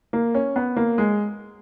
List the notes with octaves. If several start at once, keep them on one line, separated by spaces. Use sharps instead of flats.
A#3
C#4
B3
A#3
G#3